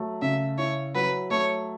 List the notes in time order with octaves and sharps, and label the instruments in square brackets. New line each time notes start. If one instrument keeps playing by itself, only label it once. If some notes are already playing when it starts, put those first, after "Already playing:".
Already playing: [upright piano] F#3 A3
[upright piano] C#3 [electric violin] E5
[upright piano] E4 [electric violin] C#5
[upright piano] F#3 [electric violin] B4
[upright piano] A3 [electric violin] C#5